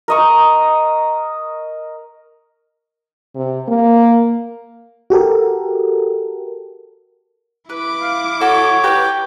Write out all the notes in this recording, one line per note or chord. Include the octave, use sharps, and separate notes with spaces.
A#4 D#5 C#6
C3
A#3
F#4 G4 A4 A#4
E4 B4 D6
F5
F#4 A4 C#5
G4 B4 A#5